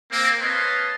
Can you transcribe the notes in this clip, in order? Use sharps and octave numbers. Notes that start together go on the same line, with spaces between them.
A#3 C4
B4 C#5 D#5 F5 A5 C6